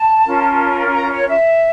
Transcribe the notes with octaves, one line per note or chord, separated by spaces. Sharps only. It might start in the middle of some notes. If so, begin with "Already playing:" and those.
Already playing: A5
C#4 F4 A#4
A#5
C#5
E5